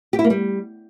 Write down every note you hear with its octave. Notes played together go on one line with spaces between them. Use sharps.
G4
E4
A#3
G3